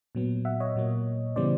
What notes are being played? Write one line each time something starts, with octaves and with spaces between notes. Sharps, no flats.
A#2 F#3 B3
E5 F#5
C#5 D#5
A#2 F#3 A#3
C#3 E3 G3 B3 C5 D5